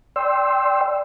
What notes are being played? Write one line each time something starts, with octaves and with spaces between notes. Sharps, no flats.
D5 G5 C6 E6